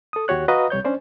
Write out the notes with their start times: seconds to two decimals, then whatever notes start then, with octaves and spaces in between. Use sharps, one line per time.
0.13 A4 D#6
0.28 D#2 F#4 G4 C#5 F#6
0.48 F#4 B4 D#5 F5 A#5 D#6
0.70 C2 G3 C#5 G6
0.85 C#4 D4 C5 D5